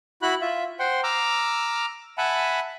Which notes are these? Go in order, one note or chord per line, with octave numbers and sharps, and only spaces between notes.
E4 F#4 B5 F#6
F4 E5
C5 F#5 G5 C6
A#5 D6 E6 F6
E5 F#5 G#5 A5 B5